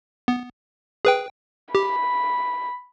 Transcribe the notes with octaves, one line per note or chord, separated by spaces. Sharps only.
B3
G#4 B4 G5
G4 B5